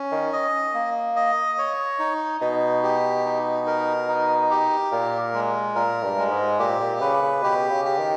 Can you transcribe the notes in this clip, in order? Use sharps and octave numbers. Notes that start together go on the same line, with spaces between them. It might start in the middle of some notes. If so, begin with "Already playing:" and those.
Already playing: C#4
D#3
D#5
A#3
D#5
C#5
D#4
B2 D#4
G4
D#4
A#4
D#4
G4
A#2 A#4
G#3
A#2 A#4
G2
G#3
G#2
A#2 G4
A#2
C#3 B4
C#3
B2 G4
C#3
G4
D#3